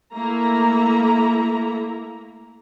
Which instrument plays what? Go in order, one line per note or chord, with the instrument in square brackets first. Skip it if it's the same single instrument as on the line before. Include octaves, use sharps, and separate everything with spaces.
[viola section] A3 A#3 E4 A#5